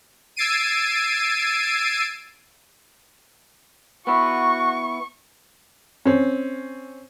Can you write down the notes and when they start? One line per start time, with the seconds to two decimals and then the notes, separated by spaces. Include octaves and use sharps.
0.36 E6 G#6 A6 C7 D7 D#7
4.07 B3 E4 F#4 C#6
6.05 C4 C#4